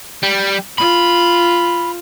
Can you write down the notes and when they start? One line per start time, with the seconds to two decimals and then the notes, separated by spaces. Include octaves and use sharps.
0.23 G3
0.78 F4 B5